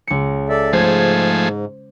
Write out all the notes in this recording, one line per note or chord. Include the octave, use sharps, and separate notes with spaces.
C#2 C#7
A4 D5 E5
G#2 F3 A3 G#4 C5 G#6